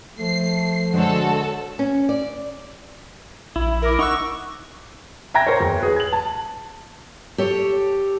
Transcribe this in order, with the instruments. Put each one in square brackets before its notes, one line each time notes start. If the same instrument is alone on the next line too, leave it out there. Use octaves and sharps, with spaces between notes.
[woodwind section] F3 [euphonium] A3 [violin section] C7
[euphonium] D3 [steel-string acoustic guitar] G#3 C5 C#5 [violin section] F#4 A4
[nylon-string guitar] C#4
D5
[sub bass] A#1 [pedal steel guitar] E4 [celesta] B5
[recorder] A#4 [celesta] B5 D6
[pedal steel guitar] D#4 E6 [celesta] F#5 D6 F#6 [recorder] C#6
[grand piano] E5 G5 A#5 G#6 A#6
A#4 C5 C#5
E2
G#4 B4
G#6 F#7
A5
[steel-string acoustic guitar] G4 A4 C#5